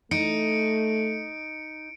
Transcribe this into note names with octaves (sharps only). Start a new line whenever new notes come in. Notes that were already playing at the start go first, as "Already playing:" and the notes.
A3 D#4 C#7 D7